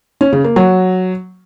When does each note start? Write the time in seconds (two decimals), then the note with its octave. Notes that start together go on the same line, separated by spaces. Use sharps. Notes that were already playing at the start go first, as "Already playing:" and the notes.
0.21 C#4
0.33 C#3
0.44 A#3
0.56 F#3